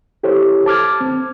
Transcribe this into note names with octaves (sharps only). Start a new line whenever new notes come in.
E4 G4 A4 C5 C#5
A5 D6 F6 G#6
C4